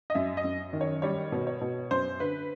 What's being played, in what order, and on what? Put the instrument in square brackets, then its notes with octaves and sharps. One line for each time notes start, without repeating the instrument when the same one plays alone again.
[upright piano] D#5
F#2 E5
D#5
F#2
D#3
C#5
G3 C#5
B2
C#5
B2
F#2 C5
D3 B4